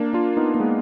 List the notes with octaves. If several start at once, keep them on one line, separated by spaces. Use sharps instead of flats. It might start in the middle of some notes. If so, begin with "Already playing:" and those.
Already playing: A#3 D4
D4 F4
B3 D#4
A#3
G#3 B3